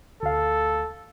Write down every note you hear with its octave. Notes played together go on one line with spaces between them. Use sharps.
D2 A4 F5